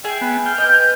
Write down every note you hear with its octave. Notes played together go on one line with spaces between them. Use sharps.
G#4 E5 G5 G#5
B3
G5 F6
B4 D#5 G6